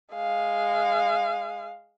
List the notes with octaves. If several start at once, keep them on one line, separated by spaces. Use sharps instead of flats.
G#3 F5